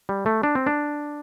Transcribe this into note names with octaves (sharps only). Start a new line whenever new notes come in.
G3
A3
D4
C4
D4